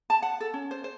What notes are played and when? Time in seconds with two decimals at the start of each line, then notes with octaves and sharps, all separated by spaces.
0.10 A5
0.22 F#5
0.40 A4
0.54 C#4
0.71 C5
0.84 C5